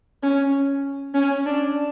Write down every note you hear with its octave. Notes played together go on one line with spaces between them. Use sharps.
C#4
C#4
D4